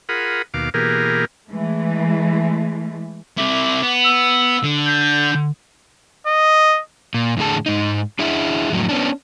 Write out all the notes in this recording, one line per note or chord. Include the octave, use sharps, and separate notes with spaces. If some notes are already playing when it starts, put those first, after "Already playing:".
F4 G#4 A#4 F#5 B5 D#6
D#2 B2 F5 D6
B2 E3 A#3 G4 G#4 A#4
E3 G#3 A3
C3 E4 D6
B3
E6
D3
G6
D#5
A#2
E2 A2 D3 G#4 A5
G#2 D#4
D4 E4 G#4 E5
F2 A2 F#3
B3 C#4 D4